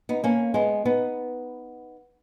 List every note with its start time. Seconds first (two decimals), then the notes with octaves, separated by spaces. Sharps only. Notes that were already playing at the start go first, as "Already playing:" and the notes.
0.09 B3 D#4
0.24 A#3 C#4
0.54 G#3 B3
0.85 B3 D#4